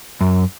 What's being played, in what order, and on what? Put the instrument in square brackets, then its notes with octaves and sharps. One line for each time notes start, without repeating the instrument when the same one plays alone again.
[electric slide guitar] F#2